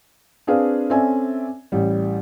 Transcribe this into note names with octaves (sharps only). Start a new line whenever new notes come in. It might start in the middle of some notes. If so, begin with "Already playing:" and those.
C4 D4 G#4 B4 F5
C4 C#4 A4 D5 E5 G#5
A1 G3